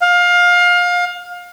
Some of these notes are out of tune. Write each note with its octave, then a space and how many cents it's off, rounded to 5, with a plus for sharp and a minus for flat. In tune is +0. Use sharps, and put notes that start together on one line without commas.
F5 +25